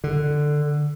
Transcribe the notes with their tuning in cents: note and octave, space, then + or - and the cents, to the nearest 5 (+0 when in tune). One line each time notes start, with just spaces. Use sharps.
D3 +10